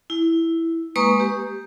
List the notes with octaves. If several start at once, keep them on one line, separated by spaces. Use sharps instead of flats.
E4
G#3 A#3 B4 A#5 C#6 D#6
G4